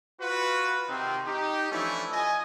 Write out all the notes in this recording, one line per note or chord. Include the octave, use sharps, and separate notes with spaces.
F4 F#4 B4
C3 D#3 C4
D#4 G4
E3 F3 A3 C#4 D4 E4
F3 D#5 G#5